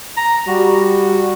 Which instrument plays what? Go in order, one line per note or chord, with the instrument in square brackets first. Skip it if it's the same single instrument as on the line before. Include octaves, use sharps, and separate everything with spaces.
[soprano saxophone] A#5
[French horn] G3 [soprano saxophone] F#4